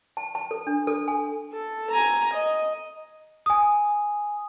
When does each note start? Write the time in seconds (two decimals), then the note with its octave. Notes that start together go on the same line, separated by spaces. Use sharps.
0.17 A5
0.35 A5
0.51 A4
0.67 D4
0.87 A4
1.08 G#5
1.53 A4
1.90 G#5 A#5
2.33 D#5
3.46 G#5 D#6